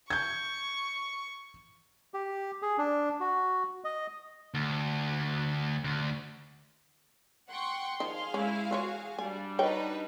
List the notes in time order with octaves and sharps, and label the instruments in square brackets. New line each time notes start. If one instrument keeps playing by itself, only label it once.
[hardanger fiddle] C#6 [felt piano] G6 G#6
[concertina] G4
G#4
D4
F#4
D#5
[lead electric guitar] D2
D2
[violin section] F#5 G5 C#6 [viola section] C6
[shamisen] D#3 F3 D#5 [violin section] G#4 F5
[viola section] G#3 E4 [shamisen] C#4
[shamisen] E3 F4 C#5 [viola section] F#4
[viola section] G3 D4 [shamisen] G#5
[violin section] D#4 B4 [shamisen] F#4 C#5 G5